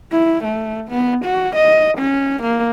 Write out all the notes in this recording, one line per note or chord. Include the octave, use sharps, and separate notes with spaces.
E4
A3
B3
F#4
D#5
C#4
A#3